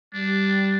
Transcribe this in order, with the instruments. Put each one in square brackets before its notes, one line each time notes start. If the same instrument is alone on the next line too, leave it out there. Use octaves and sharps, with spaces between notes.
[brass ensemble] G3 [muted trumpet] D4